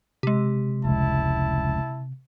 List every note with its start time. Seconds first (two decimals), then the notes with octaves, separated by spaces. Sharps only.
0.23 C3 G#3 G4
0.85 F1 C#2 E4 A5